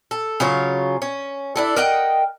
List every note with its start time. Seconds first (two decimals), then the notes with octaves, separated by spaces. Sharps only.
0.11 A4
0.40 C#3 F#3 F4 C#5
1.02 C#4
1.56 D4 E4 A4
1.76 A#4 D#5 F#5 G5